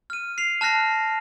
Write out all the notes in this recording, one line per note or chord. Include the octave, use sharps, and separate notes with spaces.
F6 D#7
C7 F7
A5 F6 F#6 A#6 C7